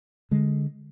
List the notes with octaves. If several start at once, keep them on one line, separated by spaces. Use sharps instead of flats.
D3 G#3